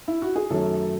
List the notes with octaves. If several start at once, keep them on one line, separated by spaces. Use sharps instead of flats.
E4
F#4
G#4
F#2 D#3 F#3 A3 A4